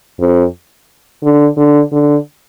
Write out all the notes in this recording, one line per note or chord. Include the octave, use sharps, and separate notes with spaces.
F2
D3
D3
D3